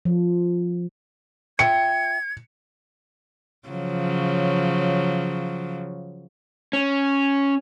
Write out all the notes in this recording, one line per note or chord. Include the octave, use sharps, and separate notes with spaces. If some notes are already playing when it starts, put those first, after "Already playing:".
F3
F4 E5 G5 G#6 C#7
C#3 F3 F#3
C#4